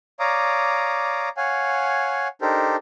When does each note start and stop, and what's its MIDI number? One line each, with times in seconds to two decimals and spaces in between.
0.20 1.29 73
0.20 1.29 74
0.20 1.29 77
0.20 1.29 82
0.20 1.29 86
0.20 1.29 87
1.37 2.28 73
1.37 2.28 77
1.37 2.28 78
1.37 2.28 80
2.41 2.76 62
2.41 2.76 63
2.41 2.76 67
2.41 2.76 69
2.41 2.76 70
2.41 2.76 72